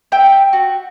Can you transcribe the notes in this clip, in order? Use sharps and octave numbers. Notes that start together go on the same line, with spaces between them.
E5 G5
F#4